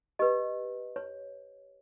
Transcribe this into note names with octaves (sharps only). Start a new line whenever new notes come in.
G4 B4 D#5
C#5